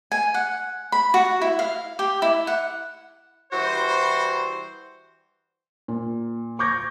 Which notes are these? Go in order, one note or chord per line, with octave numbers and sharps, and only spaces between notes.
G#5
F#5
B5
F#4
E4
F5
G4
E4
F#5
E3 G3 F#4 C5
A#2
C#6 D6 G6 G#6 A#6